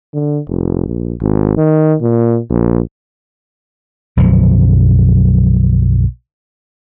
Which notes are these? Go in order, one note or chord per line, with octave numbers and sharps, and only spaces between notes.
D3
F1
A#1
G#1
D#3
A#2
A#1
B1 F#2 D3 F3